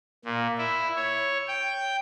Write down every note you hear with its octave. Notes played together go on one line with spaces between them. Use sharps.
A#2
E4
C#5
G5